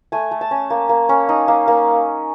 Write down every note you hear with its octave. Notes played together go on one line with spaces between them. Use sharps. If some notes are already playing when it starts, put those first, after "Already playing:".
A3 G#5
A3
A5
C#4
A#3
A#3
C#4
D#4
A#3
A#3